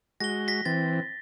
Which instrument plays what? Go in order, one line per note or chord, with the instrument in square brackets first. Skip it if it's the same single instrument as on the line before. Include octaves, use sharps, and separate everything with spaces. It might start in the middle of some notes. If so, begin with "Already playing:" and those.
[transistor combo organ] G#3 F#4 [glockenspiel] A#6 G7
[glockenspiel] A#6 B6
[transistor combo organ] E3 C4 [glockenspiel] A6